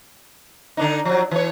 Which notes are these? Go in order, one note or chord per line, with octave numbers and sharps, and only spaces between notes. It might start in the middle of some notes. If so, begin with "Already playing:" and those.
D3 D4 D#4
F3 F#3
E3 C#5